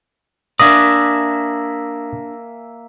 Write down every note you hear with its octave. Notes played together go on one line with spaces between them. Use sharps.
A#3 D4 D5 E5 G#5 D#6 A#6